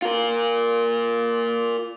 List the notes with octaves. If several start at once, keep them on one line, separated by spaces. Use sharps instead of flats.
F4 A#4